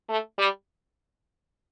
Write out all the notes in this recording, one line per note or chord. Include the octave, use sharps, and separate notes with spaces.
A3
G3